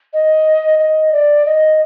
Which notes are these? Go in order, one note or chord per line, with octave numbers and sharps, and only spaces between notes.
D#5
D#5
D5
D#5